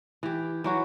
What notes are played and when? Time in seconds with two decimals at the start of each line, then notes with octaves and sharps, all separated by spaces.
0.23 E3 G4
0.64 E3 F#3 F#4